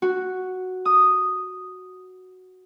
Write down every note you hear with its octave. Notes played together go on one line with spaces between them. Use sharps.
F#4
D#6